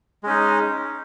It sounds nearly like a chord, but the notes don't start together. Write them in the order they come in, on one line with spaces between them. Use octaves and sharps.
G#3 C#4 D#4